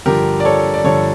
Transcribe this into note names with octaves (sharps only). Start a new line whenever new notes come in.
G2 D3 F3 G4 A#4
D5
A4 C#5
D5
G2 D3 F3 A4 C#5